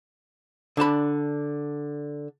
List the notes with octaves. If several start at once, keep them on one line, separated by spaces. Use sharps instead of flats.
D3 D4 A5 B5